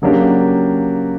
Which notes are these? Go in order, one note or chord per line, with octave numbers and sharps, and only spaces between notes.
C#3 F#3 A#3 D4 G4